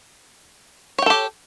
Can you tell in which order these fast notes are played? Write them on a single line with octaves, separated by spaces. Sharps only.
C#5 G5 A4 G4